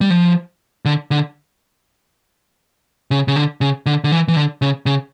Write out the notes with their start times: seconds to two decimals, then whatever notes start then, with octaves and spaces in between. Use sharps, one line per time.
0.01 G3
0.10 F3
0.85 D3
1.11 D3
3.11 C#3
3.28 C#3
3.36 D3
3.61 C#3
3.86 D3
4.04 D3
4.12 E3
4.28 E3
4.36 D3
4.62 C#3
4.86 C#3